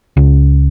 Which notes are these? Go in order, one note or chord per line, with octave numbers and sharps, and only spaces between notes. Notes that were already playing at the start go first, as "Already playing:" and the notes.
C#2